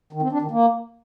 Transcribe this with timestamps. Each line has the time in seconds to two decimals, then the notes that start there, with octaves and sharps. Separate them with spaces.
0.13 D#3
0.22 C4
0.32 D4
0.42 D#3
0.51 A#3